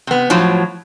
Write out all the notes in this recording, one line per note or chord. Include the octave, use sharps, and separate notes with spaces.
C3 B3
A2 F3 F#3